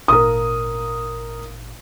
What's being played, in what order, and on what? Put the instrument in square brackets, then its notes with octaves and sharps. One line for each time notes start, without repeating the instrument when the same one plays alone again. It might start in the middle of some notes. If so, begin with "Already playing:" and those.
[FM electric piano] G#1 A#2 [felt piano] A#4 D#6